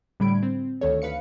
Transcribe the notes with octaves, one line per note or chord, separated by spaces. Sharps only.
A2 D3 G3 B5 G#6 D7
C4
D2 D#3 A4 C#5
D2 B4 F5 C#7